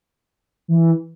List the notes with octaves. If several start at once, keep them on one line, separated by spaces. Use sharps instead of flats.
E3